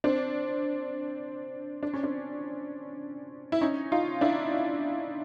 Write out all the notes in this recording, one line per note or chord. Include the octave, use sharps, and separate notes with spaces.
C4 D4
D4
C#4
C4 D4
E4
C#4 D#4
D#4 F4
D4 E4